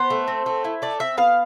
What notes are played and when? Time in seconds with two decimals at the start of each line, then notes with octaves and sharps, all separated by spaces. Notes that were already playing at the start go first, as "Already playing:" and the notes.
Already playing: B3 C5
0.10 A3
0.28 C4
0.46 A3
0.64 E4
0.82 A3 D5
1.00 C4 E5
1.18 B3 F5